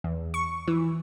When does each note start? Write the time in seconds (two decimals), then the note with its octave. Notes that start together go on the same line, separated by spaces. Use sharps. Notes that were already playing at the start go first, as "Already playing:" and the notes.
0.04 E2
0.34 C#6
0.68 E3